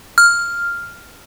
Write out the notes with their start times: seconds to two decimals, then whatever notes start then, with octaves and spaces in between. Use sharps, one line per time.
0.18 F6